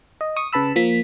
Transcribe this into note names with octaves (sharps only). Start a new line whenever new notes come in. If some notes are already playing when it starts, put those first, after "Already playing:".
D#5
C#6 D#6
C#3 B4 A5 B5 E6
F3 A#3 B6